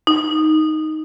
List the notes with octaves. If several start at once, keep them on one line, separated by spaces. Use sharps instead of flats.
D#4